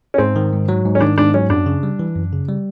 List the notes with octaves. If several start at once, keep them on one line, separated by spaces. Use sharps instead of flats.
C#4
G#2 C4
D#3
G#2
F#3
G#2
C#4
D#3 D4
G#2 D4
F#3 C#4
F#2 D4
C#3
G3
E3
F#2
C#3
G3